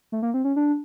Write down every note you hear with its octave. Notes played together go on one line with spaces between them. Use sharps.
A3
A#3
C4
C#4
D4